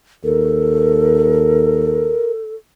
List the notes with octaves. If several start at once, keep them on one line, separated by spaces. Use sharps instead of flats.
D#2 A4 A#4